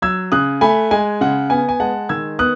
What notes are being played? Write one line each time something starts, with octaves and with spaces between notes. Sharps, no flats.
F#3 E6 G#6
C#3 D#6 F#6
A3 G#5 B5
G#3 G#5
C#3 F#5
B3 G#5
G#5
G#3 F#5 A5
D#3 E6 G#6
B3 D#6 F#6